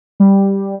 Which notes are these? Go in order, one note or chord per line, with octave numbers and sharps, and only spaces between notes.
G3